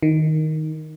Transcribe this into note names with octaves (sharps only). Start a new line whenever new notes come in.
D#3